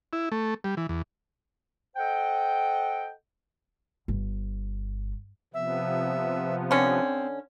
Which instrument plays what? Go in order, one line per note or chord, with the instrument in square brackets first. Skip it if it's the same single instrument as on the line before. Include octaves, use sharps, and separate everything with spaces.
[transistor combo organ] E4
A3
G3
E3
E2
[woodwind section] A4 C5 D#5 F#5 G5
[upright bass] G1
[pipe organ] C3 F3 B3 [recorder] E5
[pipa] D3 C#4 [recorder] C4